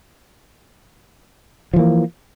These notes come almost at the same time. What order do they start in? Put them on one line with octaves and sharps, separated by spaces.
F3 E3 A#3